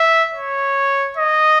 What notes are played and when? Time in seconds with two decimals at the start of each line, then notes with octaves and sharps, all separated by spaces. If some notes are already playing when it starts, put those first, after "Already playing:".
Already playing: E5
0.34 C#5
1.17 D#5